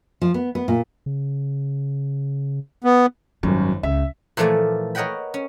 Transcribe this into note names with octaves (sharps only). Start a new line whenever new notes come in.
F3
B3
B3
A#2
C#3
B3
G#1 F#2 G3
C#2 E5
A#2 E3 F3 A3 D5 G#5
A#4 C#5 D#5 F#5 G5 B5
C#4